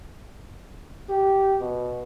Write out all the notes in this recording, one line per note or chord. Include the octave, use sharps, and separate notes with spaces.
G4
B2